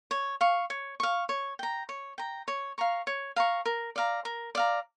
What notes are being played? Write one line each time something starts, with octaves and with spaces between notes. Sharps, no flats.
C#5
F5 C#6
C#5
F5 C#6
C#5
G5 A#5
C#5
G5 A#5
C#5
F5 A#5 C#6
C#5
F5 A#5 C#6
A#4
D5 F5 A#5
A#4
D5 F5 A#5